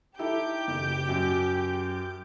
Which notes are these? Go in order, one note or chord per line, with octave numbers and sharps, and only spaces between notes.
D#4 E4 G4 A4 D6 G6
F#1
F#2